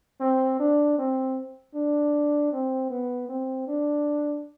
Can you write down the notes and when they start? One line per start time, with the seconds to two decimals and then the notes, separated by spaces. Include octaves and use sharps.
0.20 C4
0.59 D4
0.98 C4
1.74 D4
2.52 C4
2.90 B3
3.29 C4
3.67 D4